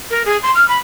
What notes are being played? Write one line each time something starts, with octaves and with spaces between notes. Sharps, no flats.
A#4
G#4
C6
F6
B5